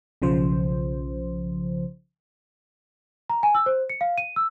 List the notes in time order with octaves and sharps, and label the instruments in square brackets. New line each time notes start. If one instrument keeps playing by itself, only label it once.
[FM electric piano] B1 C#3 F3 C5
[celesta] A#5
G#5
E6
C5
C#7
F5
D#7
E6